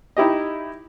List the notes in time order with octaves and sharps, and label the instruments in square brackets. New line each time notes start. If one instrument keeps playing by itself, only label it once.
[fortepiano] D#4 E4 G4 D#5